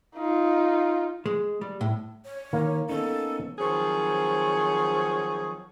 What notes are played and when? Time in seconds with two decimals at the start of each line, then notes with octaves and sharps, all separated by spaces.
0.16 D#4 F4
1.26 G#3
1.61 G3
1.81 A2
2.25 C#5
2.53 D#3 A#3 F5
2.89 B3 C#4 D#4 A4
3.59 D#3 F3 F#3 C4 G#4 C#5